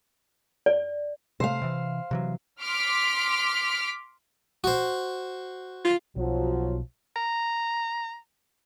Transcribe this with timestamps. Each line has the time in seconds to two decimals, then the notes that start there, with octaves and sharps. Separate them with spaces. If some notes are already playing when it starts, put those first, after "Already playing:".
0.66 D5
1.40 C3 A3 C5 F5
1.62 C3 E3
2.11 C3 E3 F#3
2.61 C6 D6 F6 B6 D7
4.64 F#4 C5
5.85 F4
6.16 B1 F3 F#3
7.16 A#5